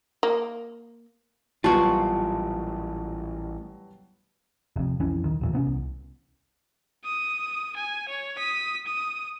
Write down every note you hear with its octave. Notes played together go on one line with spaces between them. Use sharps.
A#3
A1 A#2 F#3 G3 B3 F4 F#4 A5
F1 F2
B1 F2 E3 C#4
D#1 D#3
D#2 A#2 E3
C3 B3 C#4
C2
D#6
G#5
C#5
D#6 B6
D#6